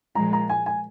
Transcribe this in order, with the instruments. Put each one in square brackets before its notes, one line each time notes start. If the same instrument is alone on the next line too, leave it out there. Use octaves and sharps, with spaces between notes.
[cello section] A#2 F3 G#3 [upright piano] A#5
[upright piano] A#5
G#5
G#5